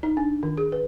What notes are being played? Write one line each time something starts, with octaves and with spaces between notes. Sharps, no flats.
D#4
D4
D#3
G#4
B4